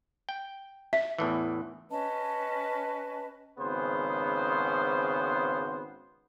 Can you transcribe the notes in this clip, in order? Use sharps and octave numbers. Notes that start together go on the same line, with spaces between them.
G5
E5
E2 A2 E3
C#4 B4 D#5 A5
G#1 C#3 B3 C5